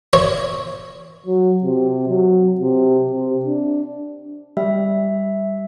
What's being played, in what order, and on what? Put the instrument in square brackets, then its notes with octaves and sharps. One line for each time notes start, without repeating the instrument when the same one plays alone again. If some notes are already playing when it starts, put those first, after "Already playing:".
[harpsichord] C#5
[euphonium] F#3
C3
F#3
C3
C3
D4
[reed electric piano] G3 [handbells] E5